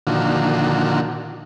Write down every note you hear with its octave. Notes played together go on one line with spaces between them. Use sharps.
A#2 D3 D#3 F3 F#4